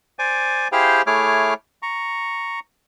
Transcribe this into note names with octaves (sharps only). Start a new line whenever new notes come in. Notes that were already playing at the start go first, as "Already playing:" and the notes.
C5 D5 G#5 D6
E4 G4 G#4 C5 F5 G5
A3 E4 G#4 C#5 D6 F6
A#5 C#6